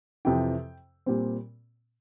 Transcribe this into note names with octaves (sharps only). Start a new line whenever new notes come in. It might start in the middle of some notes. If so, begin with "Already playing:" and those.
F2 C3 E3 G5
A#2 G3 C4